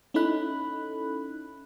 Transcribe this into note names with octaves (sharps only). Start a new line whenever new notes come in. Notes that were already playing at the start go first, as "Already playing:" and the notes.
C#4 D#4 E4 A4 B5 F#6